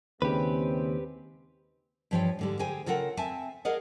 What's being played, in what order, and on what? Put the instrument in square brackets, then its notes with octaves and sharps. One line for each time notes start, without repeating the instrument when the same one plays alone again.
[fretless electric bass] D#2 C#3 [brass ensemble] G#3 C4 [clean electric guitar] G4 B4
[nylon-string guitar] G2 E3 F3 C5 C#5 G5
G#2 D3 G3
D3 G#4 C5 G5 G#5
C#3 F4 A4 A#4 F#5 G5
C4 E5 G#5 A5
G#4 A#4 D5 D#5 F5 F#5